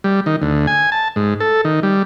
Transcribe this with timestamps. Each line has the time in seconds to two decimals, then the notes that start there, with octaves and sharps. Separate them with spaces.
0.04 G3
0.26 D#3
0.42 D2
0.67 G#5
0.92 A5
1.16 G#2
1.40 A4
1.65 D#3
1.83 G3